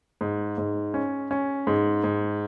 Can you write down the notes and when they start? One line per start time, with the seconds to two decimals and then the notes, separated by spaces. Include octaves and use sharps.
0.21 G#2
0.58 G#2
0.94 C#4
1.31 C#4
1.67 G#2
2.04 G#2